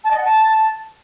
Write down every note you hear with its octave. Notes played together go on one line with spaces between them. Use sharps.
A5
D#5
F#5
A5